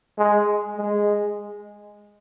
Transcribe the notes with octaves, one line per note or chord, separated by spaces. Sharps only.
G#3
G#3